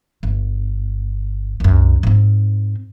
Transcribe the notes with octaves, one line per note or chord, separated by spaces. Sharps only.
G1
C2 F#2
G#2 C4